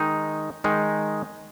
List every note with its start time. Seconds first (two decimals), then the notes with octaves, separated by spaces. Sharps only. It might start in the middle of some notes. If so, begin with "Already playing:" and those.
Already playing: D#3 G#3 D#4
0.64 D#3 G#3 D#4